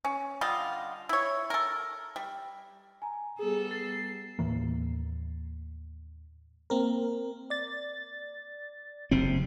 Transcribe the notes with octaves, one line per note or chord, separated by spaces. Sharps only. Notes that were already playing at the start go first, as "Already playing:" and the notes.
C#4
D3 G3 F4 D#5
E4 C#5
A4 A#4
G3
G#5 A#5
G3 B3 G#4 A4
A6 C7
D#2 A2 E3 A#3
A#3 C4 A#4
D5 A6
F#1 C3 C4